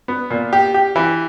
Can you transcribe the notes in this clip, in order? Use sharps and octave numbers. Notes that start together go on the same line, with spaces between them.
B3
A#2
G4
G4
E3